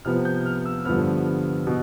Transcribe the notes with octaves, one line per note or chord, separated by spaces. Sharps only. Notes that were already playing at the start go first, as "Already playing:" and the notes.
C3 F3 B3 F6
G6
F6
E6
G2 D3 F3 B3 F6
B2